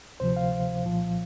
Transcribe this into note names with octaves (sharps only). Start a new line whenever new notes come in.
D2 C3 F3 C5
F5
C2 A#2 F3